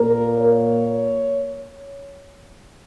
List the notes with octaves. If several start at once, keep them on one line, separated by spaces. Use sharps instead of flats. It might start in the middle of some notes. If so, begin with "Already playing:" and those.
Already playing: A#2 A#3 A#4
C#5